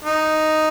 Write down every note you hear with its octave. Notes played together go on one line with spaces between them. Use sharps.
D#4